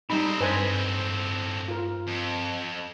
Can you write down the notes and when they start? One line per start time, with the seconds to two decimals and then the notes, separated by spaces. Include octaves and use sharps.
0.10 A2 G3 C4 D#4 B5
0.40 G2 B4 C5 D#5 G#5
1.68 F4 A#4
2.08 F2